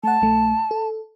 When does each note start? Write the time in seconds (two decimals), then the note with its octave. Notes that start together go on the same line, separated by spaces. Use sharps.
0.04 A3 F#5 A5
0.22 A#1 A3
0.71 A4